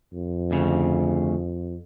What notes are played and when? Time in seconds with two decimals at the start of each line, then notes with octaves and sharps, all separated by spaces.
0.13 F2
0.51 D2 C#3